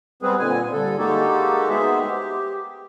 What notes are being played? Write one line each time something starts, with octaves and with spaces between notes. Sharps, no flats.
G3 G#3 B3 C4 G#4 B4
A#2 D3 G#5
G2 D3 A4
G#3 A#3 D#4 F#4 G4 A4
G#3 B3 D#4 G#4 C5 E5
G4